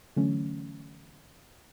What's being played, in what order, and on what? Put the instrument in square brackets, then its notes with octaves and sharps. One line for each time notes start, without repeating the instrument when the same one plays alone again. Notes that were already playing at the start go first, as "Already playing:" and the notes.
[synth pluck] D3 E3 F#3 A3 C#4